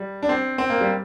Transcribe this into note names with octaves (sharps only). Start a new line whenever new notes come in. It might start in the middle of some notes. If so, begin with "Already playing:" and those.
Already playing: G3
D4
C4
C4
A#3
G3